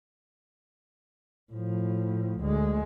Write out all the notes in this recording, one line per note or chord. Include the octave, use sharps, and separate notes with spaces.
A2 F3
D2 G#3